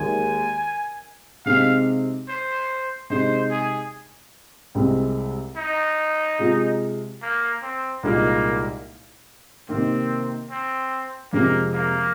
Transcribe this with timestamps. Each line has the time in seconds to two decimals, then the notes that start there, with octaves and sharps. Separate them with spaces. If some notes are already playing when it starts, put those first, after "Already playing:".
Already playing: D#2 D#3 G#3 G#5
1.46 C3 G#3 C4 D#4 F5
2.28 C5
3.10 C3 G#3 D#4 C5
3.51 G#4
4.75 C2 C3 G#3 C4
5.57 D#4
6.39 C3 G#3 F4
7.22 A#3
7.62 C4
8.03 C2 A#2 G#3 A#3 D#4
9.69 C3 D#3 A#3 C4
10.50 C4
11.33 F2 C3 F3 G#3 A#3 C4
11.74 A#3